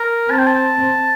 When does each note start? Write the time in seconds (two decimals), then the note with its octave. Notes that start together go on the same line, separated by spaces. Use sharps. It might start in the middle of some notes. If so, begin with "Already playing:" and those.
Already playing: A#4
0.30 C4 A5
0.39 G5
0.47 A5